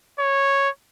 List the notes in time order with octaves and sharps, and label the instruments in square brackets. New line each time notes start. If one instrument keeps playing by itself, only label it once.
[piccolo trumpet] C#5